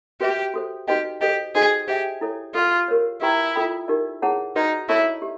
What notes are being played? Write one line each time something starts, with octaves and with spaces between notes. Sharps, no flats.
F#4 G4 B4 E5
F#4 A4 C5
D#4 F#4 G4 B4 D#5 G5
G4 A4 C5 D#5 G#5
D#4 F#4 G#4 A4 C5 D#5
G4 C5 E5 G5
E4 A4 C#5
F4 A4 D5 F5
G4 A#4 C#5
E4 G4 B4 D5 G5 A#5
F4 A4 D5 G5 B5
D#4 G4 A#4 D5
E4 G#4 C#5 F#5 A5
D#4 F#4 B4 D5
E4 A4 C#5 E5 A5 C#6
G4